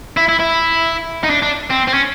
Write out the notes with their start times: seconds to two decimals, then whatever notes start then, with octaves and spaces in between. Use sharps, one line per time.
0.17 E4
0.29 E4
0.40 E4
1.23 D#4
1.30 D4
1.43 D4
1.71 C4
1.88 C4
1.94 C#4